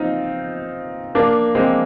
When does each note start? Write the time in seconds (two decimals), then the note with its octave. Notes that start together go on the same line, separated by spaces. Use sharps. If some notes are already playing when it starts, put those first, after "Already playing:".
Already playing: C4 D#4 F4
1.15 A#3 D4
1.55 G#3 C4